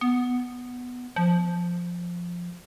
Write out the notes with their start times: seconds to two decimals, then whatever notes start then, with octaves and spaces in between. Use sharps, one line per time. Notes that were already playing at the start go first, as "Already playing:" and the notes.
0.01 B3
1.16 F3